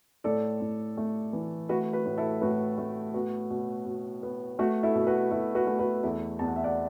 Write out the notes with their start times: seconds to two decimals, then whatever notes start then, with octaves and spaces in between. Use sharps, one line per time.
0.24 A2 A4 D5
0.61 A2
0.97 A3
1.33 E3
1.69 A3 F#4 B4
1.93 F#4 B4
2.06 A2
2.18 E4 A4
2.41 A2 F#4 B4
2.78 A3
3.14 B3 F#4
3.50 B2
3.86 B2
4.23 B3
4.59 A3 F#4
4.83 E4 A4
4.95 B2
5.07 F#4 B4
5.31 B2 E4 A4
5.55 F#4 B4
5.67 A3
5.79 F#4 B4
6.03 E2 E4 A4
6.39 E2 A5
6.48 F#5
6.56 E5
6.64 D5 F#5